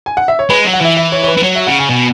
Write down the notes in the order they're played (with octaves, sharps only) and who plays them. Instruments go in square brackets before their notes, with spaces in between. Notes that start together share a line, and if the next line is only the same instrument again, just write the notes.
[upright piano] G#5
F#5
E5
C#5
[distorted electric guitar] G#3 [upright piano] B4
[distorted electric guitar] F#3
[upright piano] F#5
[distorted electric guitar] E3 [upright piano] E5
[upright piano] E5
C#5
C#5
B4
[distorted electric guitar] E3
[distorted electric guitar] F#3 [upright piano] C#5
[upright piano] E5
[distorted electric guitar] C#3 [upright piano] F#5
[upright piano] G#5
[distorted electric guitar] B2